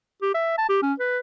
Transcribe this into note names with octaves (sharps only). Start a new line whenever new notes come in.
G4
E5
A5
G4
C#4
B4